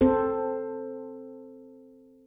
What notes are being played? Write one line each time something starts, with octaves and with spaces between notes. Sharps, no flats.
C4 A4 C5